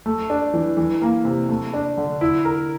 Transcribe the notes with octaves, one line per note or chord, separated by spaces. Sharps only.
A3
D4
E3
E3
A#3
C3
A3
D4
D3
E4
A#4